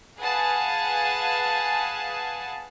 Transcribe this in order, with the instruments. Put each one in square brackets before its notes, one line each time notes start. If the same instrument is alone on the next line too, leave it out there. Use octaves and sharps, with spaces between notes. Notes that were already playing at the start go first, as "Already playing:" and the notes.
[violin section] G#4 B4 F5 F#5 G#5 A5